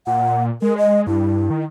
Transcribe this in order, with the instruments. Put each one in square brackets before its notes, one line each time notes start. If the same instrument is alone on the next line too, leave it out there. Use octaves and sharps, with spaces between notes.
[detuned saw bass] A#2 [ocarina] F#5
[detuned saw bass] G#3 [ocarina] A#4
[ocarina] D#5
[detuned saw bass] G2 [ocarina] E4
[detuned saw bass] D#3